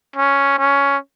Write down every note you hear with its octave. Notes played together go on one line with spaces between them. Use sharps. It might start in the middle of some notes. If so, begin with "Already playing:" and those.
C#4
C#4